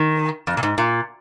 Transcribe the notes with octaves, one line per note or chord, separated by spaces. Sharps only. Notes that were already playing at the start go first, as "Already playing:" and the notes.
Already playing: D#3
F2
A#2
G#2
A#2